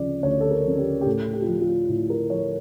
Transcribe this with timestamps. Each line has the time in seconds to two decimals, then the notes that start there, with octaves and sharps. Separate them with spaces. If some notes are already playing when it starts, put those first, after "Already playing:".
Already playing: D2 C#3 F3 D5
0.23 D2 C#5
0.41 A4
0.51 A#4
0.65 C#3 F3
0.78 G4
1.01 G4
1.06 A2 A4
1.33 G4
1.42 F4
1.47 F3 G4
1.61 F4
1.89 A2 E4
2.10 A#4
2.30 F3 C#5